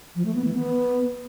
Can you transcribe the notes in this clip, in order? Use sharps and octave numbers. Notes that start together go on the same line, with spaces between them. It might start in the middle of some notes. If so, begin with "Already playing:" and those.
F3
A3
B3
E3
B3